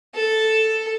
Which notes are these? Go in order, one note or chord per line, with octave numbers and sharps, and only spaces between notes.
A4